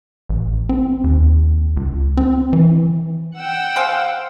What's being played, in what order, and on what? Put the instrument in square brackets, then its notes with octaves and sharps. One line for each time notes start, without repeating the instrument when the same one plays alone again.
[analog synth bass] A1
C4
D#2
C#2
C4
E3
[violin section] F#5 G5 E6
[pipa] G#4 C5 F5